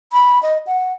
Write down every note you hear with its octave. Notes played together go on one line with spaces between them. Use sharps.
B5
D#5
F#5